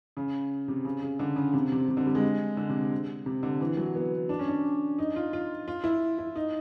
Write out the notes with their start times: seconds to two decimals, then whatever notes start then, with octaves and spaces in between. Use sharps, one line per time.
0.17 C#3
0.68 C3
0.85 C#3
1.02 C#3
1.19 D3
1.36 C#3
1.53 C3
1.72 C3
1.88 C3
1.97 D3
2.06 G3
2.15 G#3
2.57 D3
2.69 C3
3.26 C3
3.43 D3
3.60 E3
3.77 F#3
3.95 B3
4.29 D4
4.39 C#4
4.48 D4
4.98 D#4
5.16 F4
5.33 F4
5.68 F4
5.84 E4
6.18 E4
6.36 D#4